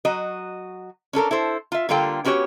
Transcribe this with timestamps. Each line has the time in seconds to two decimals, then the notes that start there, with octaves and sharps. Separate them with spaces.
0.05 F#3 F#4 D#5
1.13 C#4 D4 A4 A#4
1.31 E4 A4 C5
1.72 F4 E5
1.89 D3 G3 A#3 F4 A4 G5
2.25 B3 C#4 F#4 G4 C#5